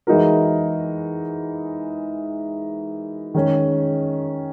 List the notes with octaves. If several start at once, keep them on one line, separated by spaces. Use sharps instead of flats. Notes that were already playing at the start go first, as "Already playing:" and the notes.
E3 G#3 D#4 F#4 A#4
D#3 G#3 C#4 G#4